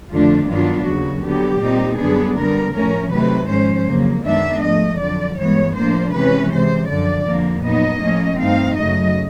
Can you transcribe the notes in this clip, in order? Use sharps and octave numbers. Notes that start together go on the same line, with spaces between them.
F2 D3 F3 A3 D4 F4
G2 D#3 F#3 B3 D4 F4
D#2 C#3 F#3 F#4
D3 F#3 B3 G4
A#2 G3 C4 D#4
F#2 D3 G3 B3 D4 G#4
D3 G3 B3 A#4
A2 F3 A3 C#4 A#4
C3 D#3 F#3 A3 C4 B4
G#2 F3 G#3 C#4 C5
F2 C#3 F#3 A#3
F#2 D#3 G#3 B3 D4 E5
G#2 F3 A3 D#5
F2 D3 F#3 D5
G2 E3 G#3 B3 C#5
A2 F3 A#3 D4 C5
C3 E3 G#3 C#4 B4
C3 E3 G#3 C5
F#2 D3 F3 D5
F2 D3 F3 A#3
A#2 F#3 B3 D#4 D#5
A2 F3 A#3 C#4
G2 E3 A3 C4 D#4 F5
F#2 C#3 F#3 A3 D#5